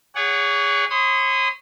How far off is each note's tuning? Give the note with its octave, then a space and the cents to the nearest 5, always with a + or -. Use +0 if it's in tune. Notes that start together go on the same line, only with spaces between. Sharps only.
G#4 -25 C#5 +30 F#5 +0
C#5 -30 C6 -40 D#6 +0